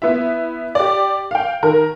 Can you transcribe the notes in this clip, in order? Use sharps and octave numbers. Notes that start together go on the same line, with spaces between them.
B3 E4 E5
G4 D5
F5 G5
D#3 A#4